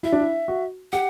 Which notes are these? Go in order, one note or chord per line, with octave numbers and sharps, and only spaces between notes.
E4 E5
D4
E4
F#4
G4 F#5